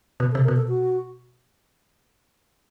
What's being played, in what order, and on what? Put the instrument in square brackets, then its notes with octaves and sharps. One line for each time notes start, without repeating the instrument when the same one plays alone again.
[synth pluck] B2 [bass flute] B4
[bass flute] A4
[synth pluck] C3
[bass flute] A#4
[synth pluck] B2
[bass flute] A4
F#4